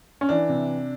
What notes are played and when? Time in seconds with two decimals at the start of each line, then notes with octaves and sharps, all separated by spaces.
0.21 C#4
0.29 E3 D4
0.49 C3